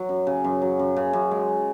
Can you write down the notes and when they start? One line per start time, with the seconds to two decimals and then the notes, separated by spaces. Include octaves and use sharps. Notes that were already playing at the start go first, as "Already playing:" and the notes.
Already playing: F#3
0.09 F#2
0.27 C#3
0.44 F#2
0.62 F#3
0.79 F#2
0.96 C#3
1.13 F#2
1.31 G#3